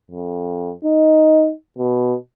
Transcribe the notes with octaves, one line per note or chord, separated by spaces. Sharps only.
F2
D#4
B2